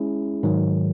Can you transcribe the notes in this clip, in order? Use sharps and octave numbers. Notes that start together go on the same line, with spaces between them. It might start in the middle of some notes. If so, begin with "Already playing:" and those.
Already playing: G#3 C#4 E4 G#4
G#2 D#3 F#3